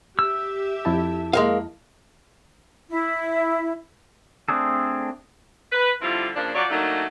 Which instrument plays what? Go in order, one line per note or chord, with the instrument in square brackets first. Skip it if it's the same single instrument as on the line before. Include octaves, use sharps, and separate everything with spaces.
[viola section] G4 E5 [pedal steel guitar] E6
[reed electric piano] F2 E4 A5
[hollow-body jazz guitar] G#3 A#3 F5
[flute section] E4
[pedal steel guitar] A3 C4 D4 G#4 A4
[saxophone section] B4
D3 F3 G3 C4 E4 F4
C#3 F3 A#3 D4
F3 F#3 F#4 C#5 D5
F#3 A3 A#3 D4 D#4